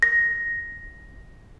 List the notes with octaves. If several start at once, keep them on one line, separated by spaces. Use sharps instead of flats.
A#6